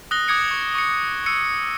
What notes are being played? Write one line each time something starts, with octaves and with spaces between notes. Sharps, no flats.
D#6 F#6 A#6 G7
D6 D#6 G#6 C#7 D7
C#6
C#6 C#7
E6 C#7 D#7